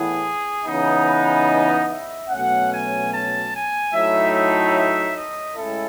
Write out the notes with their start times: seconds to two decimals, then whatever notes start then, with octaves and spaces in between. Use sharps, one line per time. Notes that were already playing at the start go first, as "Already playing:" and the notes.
Already playing: A2 E3 B3 E4 G#4
0.65 C#3 E3 B3 D#4
1.06 B4
1.47 D#5
1.88 E5
2.29 B2 F#3 A3 C#4 F#5
2.70 G#5
3.11 A5
3.52 G#5
3.92 A2 F#3 A3 D#4 E5
4.34 E5
4.74 E5
5.15 D#5
5.56 A2 G#3 C#4 E4 A4